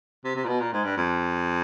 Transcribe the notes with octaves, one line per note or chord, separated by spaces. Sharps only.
C3
C3
A#2
B2
A#2
G#2
G2
F2